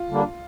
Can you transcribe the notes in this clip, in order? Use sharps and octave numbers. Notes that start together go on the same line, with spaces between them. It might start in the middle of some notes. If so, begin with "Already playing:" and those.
Already playing: F4
D3 G3 A#3 D4